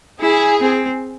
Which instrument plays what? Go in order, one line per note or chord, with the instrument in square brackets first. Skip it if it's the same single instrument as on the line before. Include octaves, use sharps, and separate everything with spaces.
[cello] E4 [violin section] G#4
[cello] C4